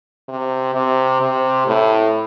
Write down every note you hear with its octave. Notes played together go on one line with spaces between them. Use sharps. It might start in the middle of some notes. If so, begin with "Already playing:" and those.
C3
C3
C3
A2